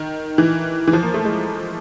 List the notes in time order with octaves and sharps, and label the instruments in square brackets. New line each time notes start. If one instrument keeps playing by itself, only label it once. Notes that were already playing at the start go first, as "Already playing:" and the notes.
Already playing: [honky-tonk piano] D#3
E3
E3
F3
A#3
A3
G#3